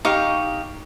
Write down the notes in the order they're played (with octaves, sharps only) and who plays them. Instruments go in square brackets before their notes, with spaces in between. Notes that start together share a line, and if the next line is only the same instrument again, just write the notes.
[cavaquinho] D#4 G4 F5 C#6